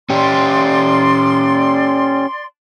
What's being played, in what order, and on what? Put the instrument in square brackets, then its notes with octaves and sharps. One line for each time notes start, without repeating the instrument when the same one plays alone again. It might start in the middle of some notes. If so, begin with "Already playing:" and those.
[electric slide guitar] C#4 G4 [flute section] D5 C6